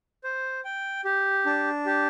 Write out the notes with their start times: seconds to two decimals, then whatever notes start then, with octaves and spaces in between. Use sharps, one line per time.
0.24 C5
0.65 G5
1.05 G4
1.46 D4
1.86 G4